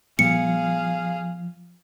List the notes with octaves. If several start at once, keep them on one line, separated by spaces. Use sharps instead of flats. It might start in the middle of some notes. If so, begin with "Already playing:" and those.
A#2 F3 G3 B3 G#4 F5 C#7